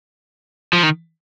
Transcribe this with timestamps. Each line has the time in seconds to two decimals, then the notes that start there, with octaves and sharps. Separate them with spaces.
0.73 F3
0.83 D#3